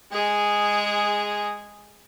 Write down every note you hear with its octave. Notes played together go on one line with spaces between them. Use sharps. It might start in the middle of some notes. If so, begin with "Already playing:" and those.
G#3 G#4